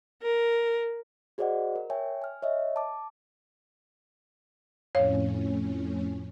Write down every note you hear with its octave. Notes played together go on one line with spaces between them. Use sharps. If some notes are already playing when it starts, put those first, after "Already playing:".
A#4
F#4 G#4 C5 D5 D#5 F#5
A#4
C#5 E5 G5 G#5
G#5 F6
C#5 D#5 E5
A5 D6
F2 A2 C#4 C#5 F5